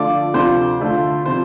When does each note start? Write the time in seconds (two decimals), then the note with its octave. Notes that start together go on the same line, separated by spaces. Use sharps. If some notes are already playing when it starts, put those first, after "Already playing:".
Already playing: D3 F3 A3 F4 D5
0.34 D2 C3 F3 D4 F4 C5
0.81 D3 A3 F4
1.25 C3 F3 C5